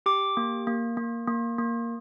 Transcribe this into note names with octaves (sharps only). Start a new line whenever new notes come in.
G4 D6
A#3
A#3
A#3
A#3
A#3